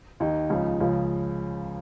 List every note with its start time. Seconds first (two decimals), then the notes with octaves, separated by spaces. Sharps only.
0.20 D#2 D#3 D#4
0.50 C#2 C#3 F3
0.80 C#2 C#3 F3